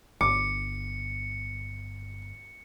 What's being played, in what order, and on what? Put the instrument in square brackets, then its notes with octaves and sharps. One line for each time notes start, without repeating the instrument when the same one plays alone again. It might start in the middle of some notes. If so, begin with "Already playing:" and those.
[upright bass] G1 [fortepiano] D6 [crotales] C#7